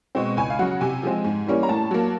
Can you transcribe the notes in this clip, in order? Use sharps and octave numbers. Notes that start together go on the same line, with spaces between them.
B2 G#3 C4
C#2 G#5
F5
C#3 F#3 F#5
C3 G#5
F3 G#3 C4
G#2
E3 G3 A#3 C#4
A#5
A2 A5
F#3 A#3